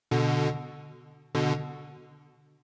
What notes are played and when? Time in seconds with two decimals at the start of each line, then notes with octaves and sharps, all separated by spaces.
0.11 B2 D3
1.35 B2 D3